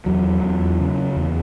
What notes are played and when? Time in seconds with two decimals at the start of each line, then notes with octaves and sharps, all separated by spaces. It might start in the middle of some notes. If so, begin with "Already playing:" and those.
0.06 E2 F#3
0.43 E2
0.80 C#3
1.17 E2